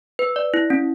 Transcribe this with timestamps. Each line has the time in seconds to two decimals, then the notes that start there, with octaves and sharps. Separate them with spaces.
0.19 B4
0.36 D5
0.54 E4
0.70 C#4